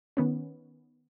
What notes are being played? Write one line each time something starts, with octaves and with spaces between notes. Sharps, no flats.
D#3 B3 C#4